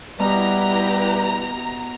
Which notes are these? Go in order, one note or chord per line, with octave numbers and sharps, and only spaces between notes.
B2 G3 B3 E4 G4 B4 A#5